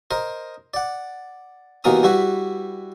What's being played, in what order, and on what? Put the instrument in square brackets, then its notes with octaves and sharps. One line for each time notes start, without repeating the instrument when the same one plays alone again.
[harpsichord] A#4 C5 D#5
D5 F#5
D#2 B2 E3 A#4 A#5 D#6
G3 E4 F#4 B4